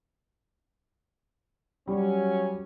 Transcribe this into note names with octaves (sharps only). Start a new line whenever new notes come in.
F#3 G3 C#4